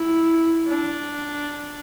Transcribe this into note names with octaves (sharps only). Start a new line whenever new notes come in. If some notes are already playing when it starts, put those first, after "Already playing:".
Already playing: E4
D4